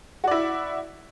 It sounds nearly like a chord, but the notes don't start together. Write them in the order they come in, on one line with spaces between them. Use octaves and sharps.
F#4 D5 E4